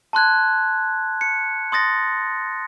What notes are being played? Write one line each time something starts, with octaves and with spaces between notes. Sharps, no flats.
A5 C6 F#6 G#6
C#7
C6 D#6 A6 A#6